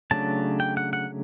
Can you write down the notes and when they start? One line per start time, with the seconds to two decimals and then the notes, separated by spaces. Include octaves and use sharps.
0.11 C#3 F#3 A3 D4 A5
0.60 G5
0.77 F#5
0.93 F#5